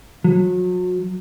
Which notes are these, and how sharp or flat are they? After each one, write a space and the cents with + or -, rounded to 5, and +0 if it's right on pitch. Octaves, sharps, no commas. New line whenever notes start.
F#3 -35